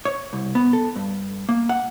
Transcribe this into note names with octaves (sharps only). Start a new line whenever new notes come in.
C#5
C2
B3
A4
G2
A#3
F#5